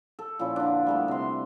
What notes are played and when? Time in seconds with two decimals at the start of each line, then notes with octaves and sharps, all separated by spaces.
0.19 A4
0.39 A#2 F3 C#4 E4
0.56 D3 D4
0.86 G3 A3 B3
1.08 C3 C6